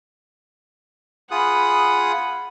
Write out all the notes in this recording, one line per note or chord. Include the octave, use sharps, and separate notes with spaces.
F4 G#4 F#5 B5 D#6